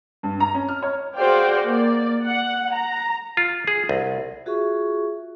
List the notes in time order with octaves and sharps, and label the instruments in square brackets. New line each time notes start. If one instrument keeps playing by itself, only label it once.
[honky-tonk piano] G2
A#5
C#4
F6
C#5
[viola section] F#4 G#4 C5 D5 F5 G5
A#3 D5
F#5
A#5
[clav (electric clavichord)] F4
G#4
C2
[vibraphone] F4 F#4 G#4 E5 C#6